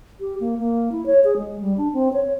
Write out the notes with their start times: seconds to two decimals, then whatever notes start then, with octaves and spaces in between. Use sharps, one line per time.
0.20 G4
0.40 A#3
0.59 A#3
0.92 E4
1.06 C#5
1.24 G#4
1.37 G#3
1.61 G3
1.78 D4
1.93 C4
2.14 C#5